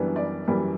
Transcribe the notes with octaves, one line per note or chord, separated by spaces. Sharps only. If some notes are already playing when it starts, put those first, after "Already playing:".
Already playing: F#2 E3 G3 B3 D4
D5
F#2 E3 G3